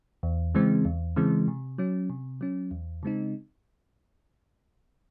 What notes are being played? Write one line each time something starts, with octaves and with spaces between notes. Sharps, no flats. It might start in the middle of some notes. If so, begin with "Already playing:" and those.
E2
C#3 E3 G#3 C4
E2
C#3 E3 G#3 C4
C3
F#3 C#4
C3
F#3 C#4
E2
C#3 G#3 C4 D#4